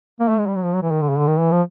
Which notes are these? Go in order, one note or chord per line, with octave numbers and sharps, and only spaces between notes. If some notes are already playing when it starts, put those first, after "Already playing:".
A#3
A3
G#3
G3
F#3
F3
F#3
E3
D#3
D3
C#3
D3
D#3
E3
F3